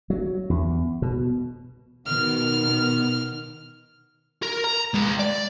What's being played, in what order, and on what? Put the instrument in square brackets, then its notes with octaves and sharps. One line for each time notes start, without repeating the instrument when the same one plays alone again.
[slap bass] F#3
E2
B2
[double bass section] B2 D#3 B3 [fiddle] F6
[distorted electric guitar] A#4
A#5
G#3 B4
D5